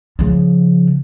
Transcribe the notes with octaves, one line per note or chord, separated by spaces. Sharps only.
C#3 F3